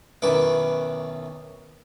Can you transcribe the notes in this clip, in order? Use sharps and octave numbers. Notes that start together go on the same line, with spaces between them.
B1 F#2 D#3 E4 B4 D6